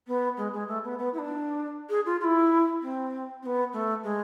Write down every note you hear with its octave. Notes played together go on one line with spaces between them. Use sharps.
B3
G#3
G#3
A3
B3
B3
E4
D4
G#4
F4
F4
E4
C4
C4
B3
A3
G#3